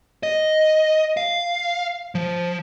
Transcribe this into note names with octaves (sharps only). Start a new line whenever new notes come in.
D#5
F5
F3